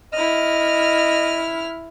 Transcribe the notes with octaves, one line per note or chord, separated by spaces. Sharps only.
E4 D#5 F6